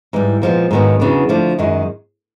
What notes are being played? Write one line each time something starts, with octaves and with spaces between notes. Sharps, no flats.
G#2 E3 G3
A#2 F3 G#3 B3
G#2 D#3 F#3 B3
E2 C#3 F#3 B3 D4
D3 F3 A3 D4
F#2 D#3 G#3